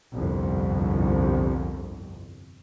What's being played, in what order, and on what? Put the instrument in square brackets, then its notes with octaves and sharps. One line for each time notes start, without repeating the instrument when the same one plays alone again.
[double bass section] G1 C2 F2